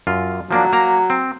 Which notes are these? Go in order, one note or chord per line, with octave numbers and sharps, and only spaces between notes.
F#2 F4
F3 F#3 A#3 D4
A#3 A#5
C4